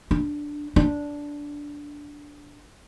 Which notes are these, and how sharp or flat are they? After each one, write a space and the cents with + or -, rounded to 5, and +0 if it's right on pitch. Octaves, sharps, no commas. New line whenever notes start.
D4 +0
D4 -10